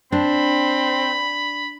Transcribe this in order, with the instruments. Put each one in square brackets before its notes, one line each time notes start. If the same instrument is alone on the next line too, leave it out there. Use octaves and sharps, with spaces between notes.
[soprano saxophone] C4 [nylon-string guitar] D4 [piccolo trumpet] B5